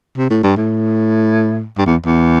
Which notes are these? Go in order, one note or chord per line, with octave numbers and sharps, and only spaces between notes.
C3
A2
G2
A2
G2
E2
E2